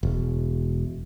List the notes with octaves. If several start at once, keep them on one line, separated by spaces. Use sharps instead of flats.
E1